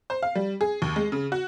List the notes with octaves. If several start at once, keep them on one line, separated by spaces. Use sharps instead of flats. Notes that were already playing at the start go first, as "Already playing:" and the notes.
C5
F5
G3
G#4
D#2
G#3
C#3
F#4